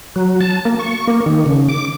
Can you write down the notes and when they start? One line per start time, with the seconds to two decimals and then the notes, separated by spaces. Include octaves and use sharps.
0.16 F#3
0.41 A5
0.65 A#3
0.79 C#6
1.08 A#3
1.26 D#3
1.46 C#3
1.69 D6